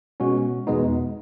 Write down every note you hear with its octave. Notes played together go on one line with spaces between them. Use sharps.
B2 G#3 C#4 F#4
E2 B2 G#3 B3 D#4